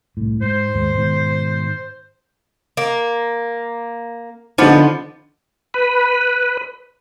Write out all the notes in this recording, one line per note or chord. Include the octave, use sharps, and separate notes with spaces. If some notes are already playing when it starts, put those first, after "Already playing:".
C2 A2
G#2 C5
D#2 G#2 G#3
G#2 B2 D#3
A#3
D3 F3 B3 D#4 D#5 D6
B4